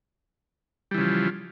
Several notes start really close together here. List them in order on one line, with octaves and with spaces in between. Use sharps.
G3 E3 C#3 F3